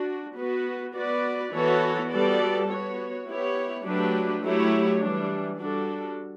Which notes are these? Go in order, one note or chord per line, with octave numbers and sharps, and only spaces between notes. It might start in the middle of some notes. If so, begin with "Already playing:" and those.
Already playing: D4 F#4
B3 F#4 B4
B3 F#4 B4 D5
E3 B3 F#4 A4 C#5
G3 B3 F#4 A4 D5
B3 F#4 C#5
B3 E4 G4 C#5
F#3 A3 D4 G4 B4
F#3 A3 E4 G4 C#5
E3 G3 D4
G3 D4 F#4 A4